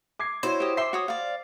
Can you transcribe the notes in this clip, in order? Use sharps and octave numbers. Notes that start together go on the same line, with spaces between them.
D6 G#6 C7
E4 F#4 C5 C#5
G4 D#5
E5 G5 C6 D6 C7
F#4 C#5 D#6
D5 F5